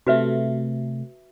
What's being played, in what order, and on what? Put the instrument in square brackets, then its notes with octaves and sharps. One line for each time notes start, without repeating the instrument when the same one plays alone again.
[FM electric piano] C3 A3 [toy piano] F#4 B4 E5